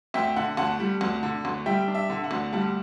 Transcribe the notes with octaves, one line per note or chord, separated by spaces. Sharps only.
D2 E5 G5
D3 F#5
D2 F#5 A5
G3
D2
D3
D2
G3 E5 G5
D4
E5
D3
F#5
D2
G3 F#5 A5